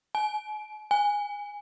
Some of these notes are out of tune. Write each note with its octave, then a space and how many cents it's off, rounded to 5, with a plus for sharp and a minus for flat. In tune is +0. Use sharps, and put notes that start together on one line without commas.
G#5 +45
G#5 -10